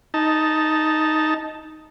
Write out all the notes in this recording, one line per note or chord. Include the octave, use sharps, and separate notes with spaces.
D#4 A5